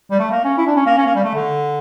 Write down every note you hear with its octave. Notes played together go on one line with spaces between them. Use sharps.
G3
A3
A#3
C#4
E4
D4
C#4
A#3
C#4
A#3
G3
A3
D3